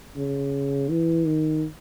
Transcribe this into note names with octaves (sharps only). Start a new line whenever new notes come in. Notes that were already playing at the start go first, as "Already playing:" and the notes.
C#3
E3
D#3